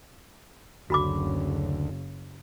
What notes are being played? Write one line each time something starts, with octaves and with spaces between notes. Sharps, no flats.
F#1 D2 C#3 F#4 B5 D6